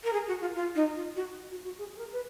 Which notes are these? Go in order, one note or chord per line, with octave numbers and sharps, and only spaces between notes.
A#4
G#4
F#4
F4
F4
D#4
F4
F#4
F#4
F#4
G#4
G#4
A#4
B4